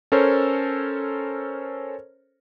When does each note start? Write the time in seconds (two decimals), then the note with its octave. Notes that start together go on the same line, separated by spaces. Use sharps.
0.12 C#4 A4 A#4 C5 C#5